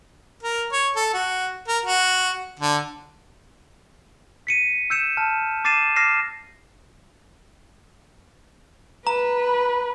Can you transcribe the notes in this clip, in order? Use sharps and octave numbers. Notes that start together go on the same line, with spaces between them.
A#4
C#5
A4
F#4
A#4
F#4
D3
B6 C#7 D#7
E6 G6 C#7 E7
A5 F6
D6 A6 C7 D#7 E7
D6 F6 A#6 C7 E7
B4 A#5